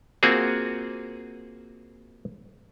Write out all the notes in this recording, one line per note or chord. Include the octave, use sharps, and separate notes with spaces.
A#3 C4 F4 F#4 G#4